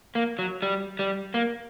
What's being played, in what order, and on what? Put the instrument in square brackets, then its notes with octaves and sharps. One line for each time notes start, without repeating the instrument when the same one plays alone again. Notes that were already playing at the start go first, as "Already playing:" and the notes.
[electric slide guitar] A#3
F#3
G3
G3
A#3